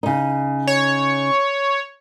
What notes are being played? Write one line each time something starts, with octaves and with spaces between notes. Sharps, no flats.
C#3 D#4
C#5